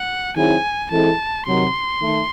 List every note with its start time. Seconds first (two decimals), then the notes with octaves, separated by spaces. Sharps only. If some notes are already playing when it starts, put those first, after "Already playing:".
Already playing: F#5
0.36 D#3 F#3 C4 E4 G#4 G#5
0.91 E3 G#3 C4 E4 A4 A5
1.46 C3 D#3 F#3 C6
2.01 D#3 A3